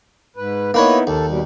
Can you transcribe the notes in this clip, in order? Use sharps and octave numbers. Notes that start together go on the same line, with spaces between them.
G#2 B4
A#3 B3 D#4 E4 B4 C#5
D#2 A4
B2 G3